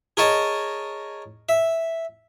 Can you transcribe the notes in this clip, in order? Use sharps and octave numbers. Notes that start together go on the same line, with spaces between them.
G#4 A#4 C#5 D#5 A5
E5